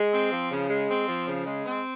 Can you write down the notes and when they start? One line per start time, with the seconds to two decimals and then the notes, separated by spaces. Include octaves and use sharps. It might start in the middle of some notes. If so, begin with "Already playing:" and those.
Already playing: G#3
0.13 C4
0.32 F3
0.51 C#3
0.69 G#3
0.90 C4
1.08 F3
1.27 C#3
1.47 G#3
1.66 C4